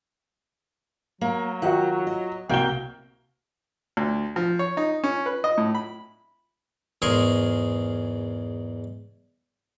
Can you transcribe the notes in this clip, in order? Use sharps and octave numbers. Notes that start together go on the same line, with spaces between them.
F#3 A#3
D#3 F4 F#4 F#5
D#5
C2 A#3 F#4 G5 G7
D2
F3
C#5
D#4
C#4
B4
D#5
A2
B5
E2 G#2 G#4 A#4 C6 C#6